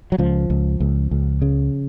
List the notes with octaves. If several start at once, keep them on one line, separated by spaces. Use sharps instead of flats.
F#3
C#2 F3
C#2
C#2
C#2
C#3